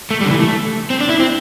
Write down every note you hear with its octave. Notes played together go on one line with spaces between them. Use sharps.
A3
G3
D3
E3
A3
C4
D4
E4
C4